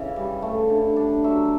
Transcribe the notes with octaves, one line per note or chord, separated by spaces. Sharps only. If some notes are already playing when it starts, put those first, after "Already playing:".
Already playing: C#3 E3 E5
G3
A3
D3
D4
F#3 E5